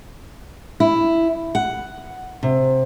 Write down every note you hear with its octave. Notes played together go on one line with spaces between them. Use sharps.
E4
F#5
C3